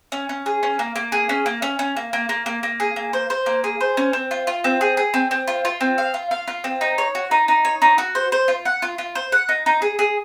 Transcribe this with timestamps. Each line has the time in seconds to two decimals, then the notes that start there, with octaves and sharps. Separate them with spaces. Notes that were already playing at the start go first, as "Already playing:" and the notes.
0.12 C#4
0.29 C#4
0.46 G#4
0.63 C#4
0.79 A#3
0.96 A#3
1.12 G#4
1.29 C#4
1.46 A#3
1.62 C#4
1.79 C#4
1.97 A#3
2.13 A#3
2.29 A#3
2.46 A#3
2.63 A#3
2.80 G#4
2.96 A#3
3.13 C5
3.30 C5
3.46 A#3
3.64 G#4
3.81 C5
3.97 C#4
4.13 C4
4.31 F4
4.47 F4
4.64 C4
4.81 G#4
4.97 G#4
5.14 C4
5.31 C4
5.48 F4
5.65 F4
5.81 C4
5.98 F5
6.14 F4
6.31 F5
6.48 F4
6.64 C4
6.81 D#4
6.98 C#5
7.15 F#4
7.31 D#4
7.48 D#4
7.65 C#5
7.82 D#4
7.98 F#4
8.15 C5
8.32 C5
8.48 F4
8.65 F#5
8.82 F4
8.98 F4
9.15 C5
9.32 F#5
9.49 D#4
9.66 D#4
9.82 G#4
9.99 G#4